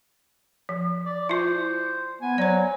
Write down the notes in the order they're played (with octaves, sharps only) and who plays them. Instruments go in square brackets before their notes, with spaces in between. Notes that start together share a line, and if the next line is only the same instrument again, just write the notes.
[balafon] F3
[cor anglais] D5
[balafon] E4 F4 [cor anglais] C5
[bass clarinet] B3 [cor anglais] G#5
[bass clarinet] F#3 [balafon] C5 D5